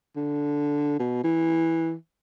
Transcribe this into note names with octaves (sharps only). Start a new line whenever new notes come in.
D3
B2
E3